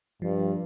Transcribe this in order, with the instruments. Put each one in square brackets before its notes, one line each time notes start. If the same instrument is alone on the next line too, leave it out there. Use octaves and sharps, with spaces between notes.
[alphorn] G2 [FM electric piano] F3